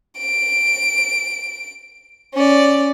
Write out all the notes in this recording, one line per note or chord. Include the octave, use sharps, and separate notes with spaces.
D7
C#4 D5